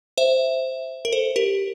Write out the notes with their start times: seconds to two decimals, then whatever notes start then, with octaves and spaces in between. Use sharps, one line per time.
0.18 C5 E5
1.05 A#4
1.12 A4 C5
1.36 G4 A#4